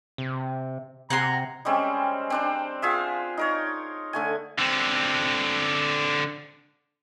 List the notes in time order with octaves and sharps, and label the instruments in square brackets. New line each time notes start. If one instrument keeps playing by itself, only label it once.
[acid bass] C3
[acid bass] C3 [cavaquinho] F#5 G#5 C6 [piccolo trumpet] A#5
[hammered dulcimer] G3 G#3 C4 C#4
C4 D4 C5
F4 G#4 E5
D#4 A#4 C#5
D3 A3 G#5
[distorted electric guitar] D3 C4